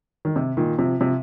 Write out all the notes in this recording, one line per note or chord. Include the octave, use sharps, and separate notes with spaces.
D#3
C3
A#2 D#3
C3 F3
C3 F3